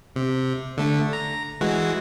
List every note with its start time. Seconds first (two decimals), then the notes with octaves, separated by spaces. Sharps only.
0.16 C3
0.77 D3 A3
1.13 A#5
1.61 E3 G#3 F#4